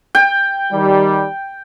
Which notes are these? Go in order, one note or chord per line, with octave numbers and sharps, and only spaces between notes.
G5
D#3 G3